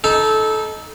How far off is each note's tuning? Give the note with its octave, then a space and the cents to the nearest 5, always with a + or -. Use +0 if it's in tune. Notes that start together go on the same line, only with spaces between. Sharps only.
D#4 +5 A4 -20